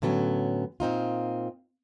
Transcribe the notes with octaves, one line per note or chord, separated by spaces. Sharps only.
A2 D3 F#3 B3 C#4
A#2 C4 D#4 F4